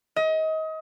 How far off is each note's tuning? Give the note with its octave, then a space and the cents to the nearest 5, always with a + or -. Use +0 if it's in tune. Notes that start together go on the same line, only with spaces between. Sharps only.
D#5 +30